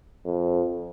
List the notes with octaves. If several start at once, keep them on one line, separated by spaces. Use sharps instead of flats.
F2